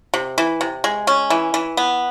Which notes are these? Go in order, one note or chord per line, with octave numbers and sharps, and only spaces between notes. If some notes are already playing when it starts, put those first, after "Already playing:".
C3
E3
C3
G#3
C#4
E3
E3
B3